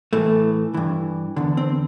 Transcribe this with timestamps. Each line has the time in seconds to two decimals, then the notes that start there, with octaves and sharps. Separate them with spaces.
0.13 A2 E3 A3
0.74 G2 E3
1.36 E2 D3
1.57 C4